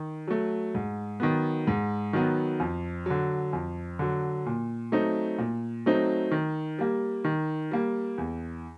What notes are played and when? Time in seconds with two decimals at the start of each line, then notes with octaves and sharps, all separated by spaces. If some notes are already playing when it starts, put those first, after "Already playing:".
Already playing: D#3
0.28 F#3 A3
0.74 G#2
1.20 D#3 F#3 B3
1.67 G#2
2.13 D#3 F#3 B3
2.60 F2
3.06 D3 F#3
3.53 F2
3.99 D3 F#3
4.46 A#2
4.92 F#3 A3 C4 D#4
5.38 A#2
5.86 F#3 A3 C4 D#4
6.31 D#3
6.79 G3 A#3
7.24 D#3
7.71 G3 A#3
8.18 E2